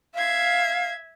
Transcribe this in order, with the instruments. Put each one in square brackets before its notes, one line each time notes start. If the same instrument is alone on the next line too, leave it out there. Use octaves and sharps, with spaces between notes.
[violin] E5 G#6 [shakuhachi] F5